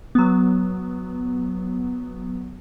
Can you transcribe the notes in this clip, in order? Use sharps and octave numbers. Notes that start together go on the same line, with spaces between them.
F#3 B3